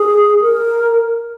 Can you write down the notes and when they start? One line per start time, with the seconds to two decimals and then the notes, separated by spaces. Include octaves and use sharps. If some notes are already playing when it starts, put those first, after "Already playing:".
Already playing: G#4
0.42 A#4